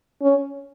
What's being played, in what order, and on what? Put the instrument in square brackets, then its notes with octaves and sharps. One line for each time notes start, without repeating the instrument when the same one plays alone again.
[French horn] C#4